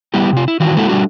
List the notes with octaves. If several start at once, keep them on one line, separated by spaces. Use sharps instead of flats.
G3 B3 E4 G4
C3 F4
E4
D#3 E3 F4 F#4
G#3 A#3 E4 F#4 A4
G3 A3 D4 F#4